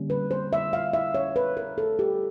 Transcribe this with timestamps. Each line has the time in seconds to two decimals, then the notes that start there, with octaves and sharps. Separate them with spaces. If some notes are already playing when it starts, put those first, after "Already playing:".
Already playing: D3 G3 A#3 C#4
0.10 B4
0.31 C5
0.53 E5
0.73 F5
0.93 E5
1.14 C#5
1.36 B4
1.57 A#4
1.78 A4
1.99 G4